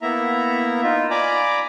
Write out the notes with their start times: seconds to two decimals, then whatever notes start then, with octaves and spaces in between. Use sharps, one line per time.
0.02 A#3 B3 E4 E5 A#5
0.83 D#4 F4
1.10 D5 G#5 A#5 B5 D6